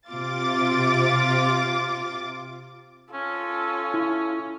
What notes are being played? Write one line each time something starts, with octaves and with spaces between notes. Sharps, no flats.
C3 F4 D6 A6
C#4 F4 A4
E4